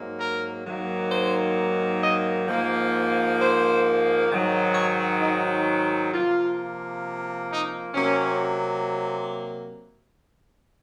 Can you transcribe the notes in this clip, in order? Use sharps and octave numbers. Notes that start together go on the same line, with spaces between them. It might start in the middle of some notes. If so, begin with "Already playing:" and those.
Already playing: G#2 F#3 A#3
A#4
G#2 D#3 F#3 A#3
C5
D#5
G#2 F3 A#3
C5
G#2 D#3 F#3
C#5
D#4
C3 F3 A#3 F4
D#4
C3 F#3 A#3 C#4